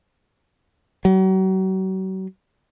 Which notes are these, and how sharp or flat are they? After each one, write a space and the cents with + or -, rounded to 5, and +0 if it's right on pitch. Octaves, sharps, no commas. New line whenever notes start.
F#3 +40